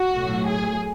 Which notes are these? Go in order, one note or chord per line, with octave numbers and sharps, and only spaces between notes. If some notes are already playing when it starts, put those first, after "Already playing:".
Already playing: F#4
B1 A2 F#3 A3
G#4